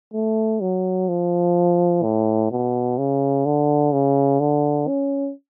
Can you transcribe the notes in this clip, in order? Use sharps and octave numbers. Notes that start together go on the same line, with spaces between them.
A3
F#3
F3
A2
B2
C#3
D3
C#3
D3
C#4